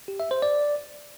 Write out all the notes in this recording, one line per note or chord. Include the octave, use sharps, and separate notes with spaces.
G4
E5
C5
D5